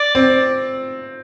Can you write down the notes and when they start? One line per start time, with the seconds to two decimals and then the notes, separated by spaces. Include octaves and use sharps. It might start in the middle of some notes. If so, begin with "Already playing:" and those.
Already playing: D5
0.15 C4